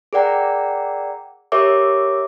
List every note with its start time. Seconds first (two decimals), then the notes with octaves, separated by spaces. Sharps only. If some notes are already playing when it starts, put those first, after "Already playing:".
0.13 G#4 A#4 D5 F#5 G5 A#5
1.52 G4 A#4 C#5 E5 D6